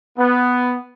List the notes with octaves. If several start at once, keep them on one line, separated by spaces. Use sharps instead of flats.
B3